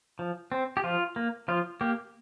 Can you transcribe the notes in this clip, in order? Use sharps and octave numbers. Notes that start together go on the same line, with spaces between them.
F3
C4
G4
F3 F4
A#3
F3 F4
A#3 G4